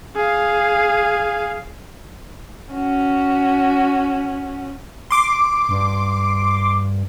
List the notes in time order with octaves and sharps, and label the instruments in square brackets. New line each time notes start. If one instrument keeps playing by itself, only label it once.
[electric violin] G#4 F5
[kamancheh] C#4 F#4
[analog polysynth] C6 D6
[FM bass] G2